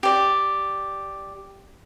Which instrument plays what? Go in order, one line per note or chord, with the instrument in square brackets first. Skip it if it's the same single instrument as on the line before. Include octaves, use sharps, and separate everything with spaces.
[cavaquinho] G4 D5